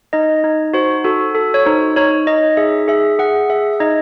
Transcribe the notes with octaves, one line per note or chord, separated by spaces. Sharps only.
D#4 D#5
D#4
F#4 C5
F#4 A4
A4
C#5
D#4 C5
D#4 C#5
D#4 D#5
G#4 E5
G#4 E5
G#4 F#5
G#4 E5
E5
D#4 D#5